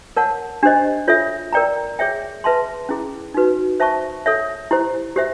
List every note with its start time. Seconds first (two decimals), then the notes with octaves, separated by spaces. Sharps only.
0.17 A#4 C#5 F#5 A5
0.63 D4 G4 C5 D#5
1.08 F4 A4 C#5 E5
1.53 A#4 D5 G5 A#5
1.99 G#4 C#5 E5 G5
2.44 G#4 B4 E5 A5 C6
2.89 C#4 E4 G#4
3.34 D#4 F#4 B4
3.80 C5 E5 A5 C#6
4.26 A4 C#5 E5
4.71 E4 G4 C5
5.16 G4 C5 E5